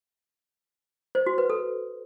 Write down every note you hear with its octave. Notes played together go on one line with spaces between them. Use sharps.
C5
F#4
B4
A4